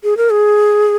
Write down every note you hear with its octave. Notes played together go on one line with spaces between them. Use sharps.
G#4
A#4
G#4